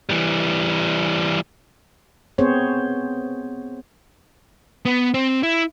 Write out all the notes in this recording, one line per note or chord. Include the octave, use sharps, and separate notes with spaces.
E3 G3
B3 C4 G#4 C5 C#5
B3
C4
E4